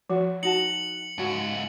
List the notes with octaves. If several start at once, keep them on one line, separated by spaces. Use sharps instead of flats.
F3 F#4
D#4 F#4 A5 C#7 F#7
C#2 G#2 C#4 F#4